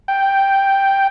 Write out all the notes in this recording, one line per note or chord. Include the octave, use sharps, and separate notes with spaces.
G5